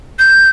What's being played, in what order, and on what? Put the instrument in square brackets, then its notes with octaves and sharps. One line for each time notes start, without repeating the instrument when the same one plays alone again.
[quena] G6